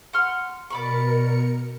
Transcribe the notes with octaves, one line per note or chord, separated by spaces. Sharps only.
F#5 C6 F6
B2 A#4 D5 B5 C#6 C#7